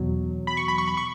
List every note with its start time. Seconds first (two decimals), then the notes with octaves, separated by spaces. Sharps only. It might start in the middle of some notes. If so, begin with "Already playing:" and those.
Already playing: E2 B2 F#3
0.47 B5
0.57 C#6
0.68 B5
0.78 C#6
0.88 B5
0.97 C#6